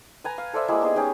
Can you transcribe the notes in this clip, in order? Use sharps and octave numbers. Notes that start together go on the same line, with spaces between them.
B4 G#5 A#5
F5
A4 C5 D5 E5
G3 G#3 A#3 E4
B3 D#4 G#4
C#4 D#4 G4 G#4